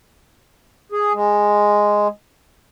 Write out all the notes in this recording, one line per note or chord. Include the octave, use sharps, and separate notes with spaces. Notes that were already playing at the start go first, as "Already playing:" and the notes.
G#4
G#3